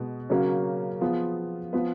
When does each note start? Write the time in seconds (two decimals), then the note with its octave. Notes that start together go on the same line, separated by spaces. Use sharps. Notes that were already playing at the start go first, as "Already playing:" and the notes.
Already playing: B2 G#3 B3
0.30 C#3 F#3 A#3 C#4 F#4
1.01 F3 B3 F4 G#4
1.73 F3 B3 F4 B4